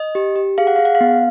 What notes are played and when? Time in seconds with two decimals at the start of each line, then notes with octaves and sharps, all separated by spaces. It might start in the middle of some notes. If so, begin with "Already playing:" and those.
Already playing: D#5
0.15 G4
0.36 G4
0.58 G#4 F5
0.67 F#5
0.76 G#4 F5
0.85 F#5
0.95 F5
1.01 B3